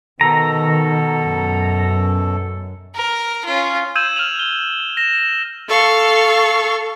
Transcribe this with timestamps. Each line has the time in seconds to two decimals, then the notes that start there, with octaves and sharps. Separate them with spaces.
0.21 B2 D#3 A4 A#5
1.25 F#2
2.95 A#4
3.45 C#4 F4
3.95 E6 G6 G#6 D#7 E7 F#7
4.16 F6 D#7 F7 F#7
4.39 G7
4.97 A#6 E7
5.67 A4 F5 C#6